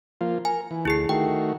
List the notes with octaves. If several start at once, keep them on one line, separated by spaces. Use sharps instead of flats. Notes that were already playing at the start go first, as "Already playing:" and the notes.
F3 A#3 F4
A#4 G#5
E3
D2 E4 G#4 C7
D#3 A3 F#4 G5